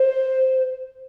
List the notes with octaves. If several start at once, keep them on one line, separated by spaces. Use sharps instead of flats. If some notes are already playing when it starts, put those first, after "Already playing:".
Already playing: C5